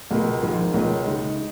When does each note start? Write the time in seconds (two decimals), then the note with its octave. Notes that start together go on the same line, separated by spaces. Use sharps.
0.11 C#2 B2 A#3
0.42 G#1 G#2 F3
0.74 C#2 B2 A#3 C#4 F4
1.05 C#3 G#3 D#4
1.36 D#4